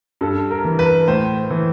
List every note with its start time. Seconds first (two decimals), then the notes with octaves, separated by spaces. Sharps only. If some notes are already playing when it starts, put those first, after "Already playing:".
0.21 G2 A4
0.51 A#4
0.64 E3
0.79 B4
1.08 A2 C5
1.51 E3